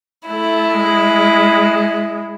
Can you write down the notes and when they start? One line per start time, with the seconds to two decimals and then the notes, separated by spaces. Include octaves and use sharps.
0.28 A3 E4
0.74 G#3